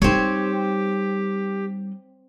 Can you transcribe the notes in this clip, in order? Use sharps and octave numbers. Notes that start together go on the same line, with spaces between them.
G3 C4 D#4 G4 C#5